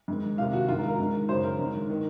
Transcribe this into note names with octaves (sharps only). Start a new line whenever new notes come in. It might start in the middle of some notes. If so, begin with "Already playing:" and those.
G#2 D#3
F2 C3 D#3 F5
F#4
G#2 D#3 F4
A#4
A#4
G#2 D#3
F#2 C#3 C5
A#4
G#2 D#3
D#3